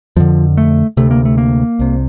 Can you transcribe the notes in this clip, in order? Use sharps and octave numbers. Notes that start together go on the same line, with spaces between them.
F2 D3 F3
A3
D2 C3 A3
A#3
A3
A#3
C2 C3